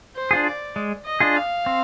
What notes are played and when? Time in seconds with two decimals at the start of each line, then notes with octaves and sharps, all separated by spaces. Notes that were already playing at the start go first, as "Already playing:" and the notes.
0.15 C5
0.31 D4 F4 G#4
0.46 D5
0.76 G#3
1.06 D#5
1.20 D4 F4 G#4
1.36 F5
1.66 C4